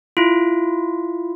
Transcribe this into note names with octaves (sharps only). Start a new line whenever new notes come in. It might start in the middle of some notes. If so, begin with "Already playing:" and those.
E4 F4